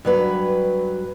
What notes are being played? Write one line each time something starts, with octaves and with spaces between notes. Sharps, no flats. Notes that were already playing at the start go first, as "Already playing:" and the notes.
G2 F#3 B4